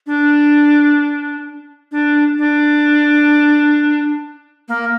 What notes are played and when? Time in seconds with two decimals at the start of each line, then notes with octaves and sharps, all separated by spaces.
0.07 D4
1.92 D4
2.38 D4
4.68 A#3